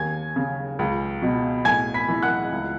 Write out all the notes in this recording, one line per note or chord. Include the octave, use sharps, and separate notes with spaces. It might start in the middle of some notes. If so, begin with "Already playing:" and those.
Already playing: D#2 G#5 G#6
C#3
C#2
B2
A2 G#5 G#6
B5 B6
E3
F#5 F#6
C#2